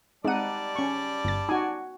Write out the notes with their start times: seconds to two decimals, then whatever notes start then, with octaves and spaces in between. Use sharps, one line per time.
0.25 G3 G#3 C4 D#4 D5 F#5 A5 D#7
0.76 C#4 C#6
1.25 G1 A6
1.49 D#4 F#4 G#5